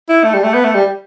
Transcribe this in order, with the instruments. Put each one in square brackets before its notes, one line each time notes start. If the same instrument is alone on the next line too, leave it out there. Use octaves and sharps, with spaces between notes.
[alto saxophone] E4
A3
G3
A3
B3
A3
G3